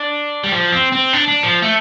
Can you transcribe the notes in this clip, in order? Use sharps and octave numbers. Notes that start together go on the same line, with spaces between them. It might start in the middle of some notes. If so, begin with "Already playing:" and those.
Already playing: D4
G3
F3
C4
C4
D4
D4
F3
A3